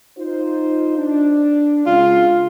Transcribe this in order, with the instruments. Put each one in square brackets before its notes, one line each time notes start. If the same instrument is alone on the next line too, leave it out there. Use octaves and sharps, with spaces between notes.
[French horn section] D#4 F4 C5
D4
[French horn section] C#3 G#3 [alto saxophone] F4